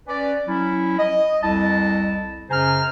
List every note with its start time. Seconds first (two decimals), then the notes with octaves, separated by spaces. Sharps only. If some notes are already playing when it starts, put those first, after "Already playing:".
0.08 C#4 B4 D5
0.48 F#3 C#4 E4
0.99 D#5
1.43 C2 F2 E4 D#5 A5
2.50 F#2 C#3 C5 G#5 A#5 F6